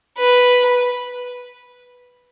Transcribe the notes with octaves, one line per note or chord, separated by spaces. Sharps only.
B4